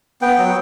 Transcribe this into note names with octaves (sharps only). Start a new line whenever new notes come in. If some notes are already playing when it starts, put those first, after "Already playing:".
B3 G5
F#3